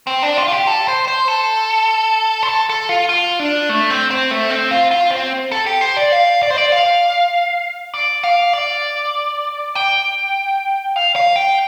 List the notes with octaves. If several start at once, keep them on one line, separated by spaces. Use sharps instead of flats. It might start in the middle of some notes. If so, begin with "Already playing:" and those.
C4
D4
F4
F4
G4
A4
C5
C5
A4
C5
A4
A4
F4
F4
D4
A3
C4
C4
A3
C4
F4
F4
C4
A4
G4
C5
D5
F5
D5
C5
D5
F5
D5
F5
D5
G5
F5
F5
G5